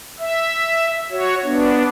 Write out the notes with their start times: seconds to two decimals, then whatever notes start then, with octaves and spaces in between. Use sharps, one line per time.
0.19 E5
1.11 F#4 C#5
1.44 B3 D4